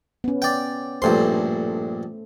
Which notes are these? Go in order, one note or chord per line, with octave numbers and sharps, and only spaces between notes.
B3 C#4
D5 G5
A#1 G2 A3 A4 C5 C6